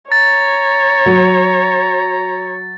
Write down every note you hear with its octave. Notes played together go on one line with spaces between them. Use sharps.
C#5 A#5 A6
F#3